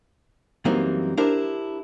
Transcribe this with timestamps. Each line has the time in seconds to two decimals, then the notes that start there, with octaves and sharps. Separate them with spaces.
0.65 F#2 E3 G3 A#3 C4 D#4
1.17 D4 E4 G4 A#4 C5